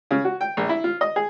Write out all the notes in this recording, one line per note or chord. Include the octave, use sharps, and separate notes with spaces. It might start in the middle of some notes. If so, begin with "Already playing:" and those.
C#3
F#4
G5
A#1
E4
F4
D#5
G#4